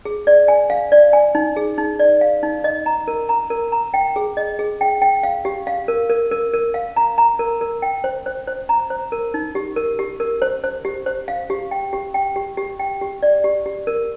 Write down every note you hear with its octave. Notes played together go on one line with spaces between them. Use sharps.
G#4
D5
G#5
F5
D5
G#5
D#4
G#4
D#4
D5
F5
D#4
D#5
A#5
A#4
A#5
A#4
A#5
G5
G#4
D#5
G#4
G5
G5
F5
G4
F5
A#4
A#4
A#4
A#4
F5
A#5
A#5
A#4
A#4
G5
C5
C5
C5
A#5
C5
A#4
D#4
G4
A#4
G4
A#4
C5
C5
G4
C5
F5
G4
G5
G4
G5
G4
G4
G5
G4
D5
G4
G4
A#4